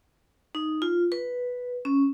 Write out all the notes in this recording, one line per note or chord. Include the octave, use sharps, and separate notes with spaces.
D#4
F4
B4
C#4